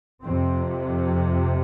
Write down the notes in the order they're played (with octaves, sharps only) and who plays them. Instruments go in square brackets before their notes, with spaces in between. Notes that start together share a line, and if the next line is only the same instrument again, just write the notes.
[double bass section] F2 C3 C4